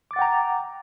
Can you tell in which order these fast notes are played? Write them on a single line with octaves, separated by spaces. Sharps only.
D6 A6 F#5 G5 A#5